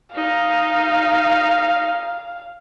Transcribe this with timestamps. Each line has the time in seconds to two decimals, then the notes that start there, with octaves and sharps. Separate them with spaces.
0.15 D#4 F5